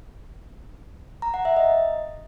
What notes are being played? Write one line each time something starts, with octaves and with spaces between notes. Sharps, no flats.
A#5
F#5
E5
D#5